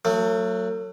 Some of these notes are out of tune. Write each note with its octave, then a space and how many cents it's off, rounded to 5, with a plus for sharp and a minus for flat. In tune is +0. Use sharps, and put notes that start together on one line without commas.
F#3 +0 A3 +40